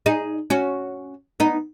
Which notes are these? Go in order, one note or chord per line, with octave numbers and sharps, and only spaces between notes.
D#4 G#4
C#4 F#4
B3 D#4